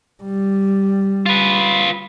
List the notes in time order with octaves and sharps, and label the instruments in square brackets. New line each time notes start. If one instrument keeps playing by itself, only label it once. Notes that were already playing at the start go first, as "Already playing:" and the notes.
[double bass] G3
[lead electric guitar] F4 B4